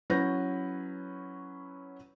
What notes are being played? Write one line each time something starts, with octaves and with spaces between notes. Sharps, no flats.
F#3 C#4 E4 B4 G6 A#6